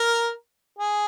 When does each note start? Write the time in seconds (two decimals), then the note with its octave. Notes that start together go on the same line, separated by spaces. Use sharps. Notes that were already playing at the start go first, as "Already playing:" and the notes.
Already playing: A#4
0.79 G#4